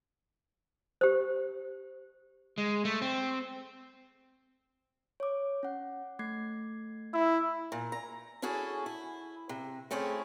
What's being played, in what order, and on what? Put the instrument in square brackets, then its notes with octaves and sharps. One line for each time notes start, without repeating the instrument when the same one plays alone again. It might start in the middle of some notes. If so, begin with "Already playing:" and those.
[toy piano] G4 C5
[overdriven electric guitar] G#3
A3
C4
[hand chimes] C#5 D6
C#4 F#5
A3 G#6 C7
[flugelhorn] E4 [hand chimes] E6
[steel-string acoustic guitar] A#2
A#5
C#4 E4 F#4 G#4 A4
E4
C3
A3 C4 C#4 E4 G#4